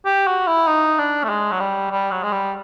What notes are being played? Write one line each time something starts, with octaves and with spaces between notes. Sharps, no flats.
G4
F#4
E4
D#4
D4
A3
G#3
F#3
G3
G3
F#3
G#3
G3